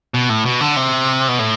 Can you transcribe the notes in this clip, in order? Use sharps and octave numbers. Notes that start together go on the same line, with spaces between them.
B2
A2
B2
D3
C3
B2
A2